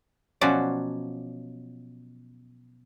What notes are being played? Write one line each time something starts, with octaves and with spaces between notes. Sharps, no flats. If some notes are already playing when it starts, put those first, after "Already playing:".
B2 F3 F#3 C#4 D5